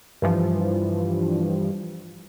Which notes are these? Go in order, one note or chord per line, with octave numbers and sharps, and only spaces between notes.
G2 E3 F3